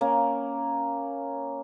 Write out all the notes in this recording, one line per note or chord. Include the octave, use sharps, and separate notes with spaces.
A#3 C#4